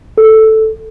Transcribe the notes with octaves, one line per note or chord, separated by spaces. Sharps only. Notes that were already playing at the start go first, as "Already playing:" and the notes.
A4